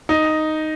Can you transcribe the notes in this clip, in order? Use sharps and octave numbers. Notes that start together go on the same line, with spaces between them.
D#4